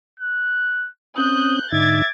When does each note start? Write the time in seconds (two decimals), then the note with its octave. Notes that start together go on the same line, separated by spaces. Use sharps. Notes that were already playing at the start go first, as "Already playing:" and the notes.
0.20 F#6
1.18 C4 C#4 D#6 F#6 G6
1.72 G#2 D3 D#4 E5 D6 G#6 A6